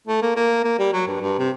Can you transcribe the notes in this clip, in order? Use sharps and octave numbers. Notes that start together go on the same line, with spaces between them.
A3
A#3
A#3
A#3
G3
F#3
G2
G2
C3